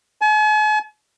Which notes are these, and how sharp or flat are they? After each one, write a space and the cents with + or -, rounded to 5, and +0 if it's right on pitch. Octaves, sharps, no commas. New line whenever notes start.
G#5 +45